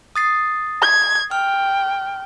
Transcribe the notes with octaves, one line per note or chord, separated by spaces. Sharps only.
D#6 A6 C7
G#6
G5 F6